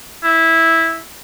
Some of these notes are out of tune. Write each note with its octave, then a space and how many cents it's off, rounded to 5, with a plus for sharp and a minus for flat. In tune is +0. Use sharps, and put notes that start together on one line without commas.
E4 -10